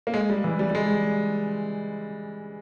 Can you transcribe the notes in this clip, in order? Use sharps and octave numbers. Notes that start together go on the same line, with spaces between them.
A#3
G#3
G3
E3
G3
G3
G#3